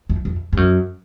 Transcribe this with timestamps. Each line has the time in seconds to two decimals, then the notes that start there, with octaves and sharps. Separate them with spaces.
0.09 F2
0.25 F2
0.53 G2
0.57 F#2